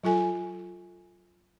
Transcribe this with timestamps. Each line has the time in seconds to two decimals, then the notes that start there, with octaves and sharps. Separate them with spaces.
0.04 F#3 F4 A4 G#5